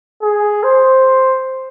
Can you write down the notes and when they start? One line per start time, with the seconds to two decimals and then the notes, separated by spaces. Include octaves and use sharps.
0.23 G#4
0.63 C5